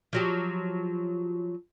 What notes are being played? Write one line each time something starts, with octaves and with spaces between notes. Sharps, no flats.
F3 F#3 G4